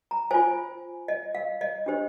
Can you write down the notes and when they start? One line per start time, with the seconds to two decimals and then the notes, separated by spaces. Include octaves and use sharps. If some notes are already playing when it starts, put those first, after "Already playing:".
0.11 A#5
0.31 F4 C5 G#5
1.08 D#5
1.35 F5
1.61 D#5
1.86 D4 G4 C5